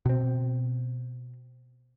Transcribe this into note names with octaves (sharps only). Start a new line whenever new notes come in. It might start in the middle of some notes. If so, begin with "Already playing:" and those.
B2 C4